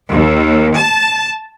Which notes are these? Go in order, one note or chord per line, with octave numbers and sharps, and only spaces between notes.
D#2
A5